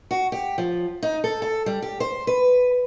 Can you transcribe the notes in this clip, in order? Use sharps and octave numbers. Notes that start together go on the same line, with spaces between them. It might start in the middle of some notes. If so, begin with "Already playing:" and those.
F#4
G4
F3
D#4
A4
A4
G3
G4
C5
B4